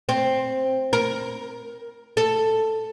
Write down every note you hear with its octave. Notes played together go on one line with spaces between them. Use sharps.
C4
A#4
A4